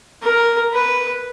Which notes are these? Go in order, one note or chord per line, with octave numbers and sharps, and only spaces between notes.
A#4
B4